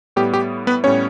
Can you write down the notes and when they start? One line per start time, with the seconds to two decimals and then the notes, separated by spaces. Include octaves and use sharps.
0.16 A2 G3 B3 G4
0.34 G4
0.67 B3 B4
0.84 A2 G3 B3 C#4 C#5